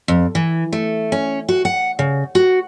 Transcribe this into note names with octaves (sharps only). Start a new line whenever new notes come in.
F2
E3
A3
C#4
F#4
F#5
C#3
F#4